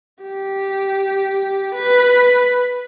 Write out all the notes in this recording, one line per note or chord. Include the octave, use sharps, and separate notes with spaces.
G4
B4